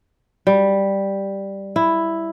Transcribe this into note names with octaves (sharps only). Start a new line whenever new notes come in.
G3
E4